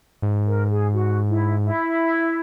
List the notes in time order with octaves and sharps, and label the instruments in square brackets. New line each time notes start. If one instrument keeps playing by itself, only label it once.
[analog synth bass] G#2
[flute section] A#4
G#4
F#4
E4
E4